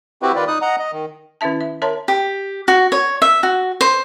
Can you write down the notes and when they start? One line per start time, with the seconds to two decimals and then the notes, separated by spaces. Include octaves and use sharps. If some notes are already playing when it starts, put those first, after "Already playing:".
0.22 C4 E4 F#4 G4 B4
0.35 D#3 F4 B4 D5
0.48 D#4 D#6 F#6
0.62 D#5 F#5 A#5
0.79 D#5
0.92 D#3
1.41 D#3 C#4 E4 E5 A5
1.61 E5
1.82 A#4 C#5 E5 A5 A#5 C6
2.08 G4
2.68 F#4
2.92 C#5
3.22 E5
3.43 F#4
3.81 C5